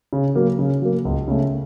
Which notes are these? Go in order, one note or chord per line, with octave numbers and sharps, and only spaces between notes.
C#3
F#3 A#3
C#3
F#3 A#3
C#2
C#3 A3